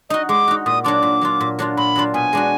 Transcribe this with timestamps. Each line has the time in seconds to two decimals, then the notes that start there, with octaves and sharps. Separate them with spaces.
0.10 D#4 F#4 D#5
0.29 G#3 D6
0.48 D#4 F#4
0.66 A#2 D#6
0.84 F#3 D4 F4 D6
1.03 A#2
1.21 F#3 D4 F4
1.41 A#2
1.59 F#3 D4 F4
1.77 A#2 B5
1.96 F#3 D4 F4
2.14 B2 G#5
2.33 G#3 D4 F#4